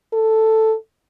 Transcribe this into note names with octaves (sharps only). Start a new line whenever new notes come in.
A4